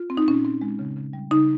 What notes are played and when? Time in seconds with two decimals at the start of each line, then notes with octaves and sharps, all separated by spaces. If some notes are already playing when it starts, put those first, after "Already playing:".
Already playing: F4
0.10 C4
0.17 D#4
0.27 A#2 C#4
0.45 C4
0.61 G#3
0.79 C#3
0.97 C#3
1.13 G3
1.31 C#3 D#4